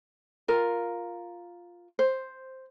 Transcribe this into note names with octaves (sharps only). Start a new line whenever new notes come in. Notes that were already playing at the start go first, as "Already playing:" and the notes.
F4 A#4
C5